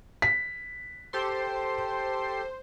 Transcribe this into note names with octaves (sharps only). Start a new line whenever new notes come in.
B6
G4 A4 C5 C6